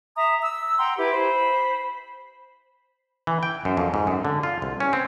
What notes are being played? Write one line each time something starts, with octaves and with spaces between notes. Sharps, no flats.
E5 A#5 D#6
E6
F#5 G5 A#5 C6
E4 G4 B4
C5 B5
E3
G5
F#2
F2
G#2
F#2
D3
F4
C2
C#4
C4